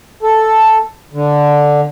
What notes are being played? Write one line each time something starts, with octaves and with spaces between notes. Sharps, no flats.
A4
D3